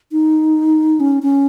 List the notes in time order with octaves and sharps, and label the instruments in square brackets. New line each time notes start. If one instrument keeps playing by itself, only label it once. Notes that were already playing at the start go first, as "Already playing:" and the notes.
[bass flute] D#4
C#4
C#4